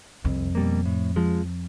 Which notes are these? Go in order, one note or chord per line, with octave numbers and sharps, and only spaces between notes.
C2 F2
B2 G3 A#3
A2
F3 G#3